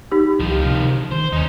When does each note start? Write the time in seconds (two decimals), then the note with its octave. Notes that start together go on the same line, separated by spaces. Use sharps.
0.12 D#4 G4
0.40 C#2 D#3 F3
0.66 C3
1.12 D#3 C5
1.33 D#2 C#4 D#4